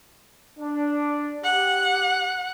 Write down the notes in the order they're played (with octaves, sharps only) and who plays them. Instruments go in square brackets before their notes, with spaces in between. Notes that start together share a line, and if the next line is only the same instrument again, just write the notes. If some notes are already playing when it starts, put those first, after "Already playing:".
[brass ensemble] D4
[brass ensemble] G4 [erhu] F#5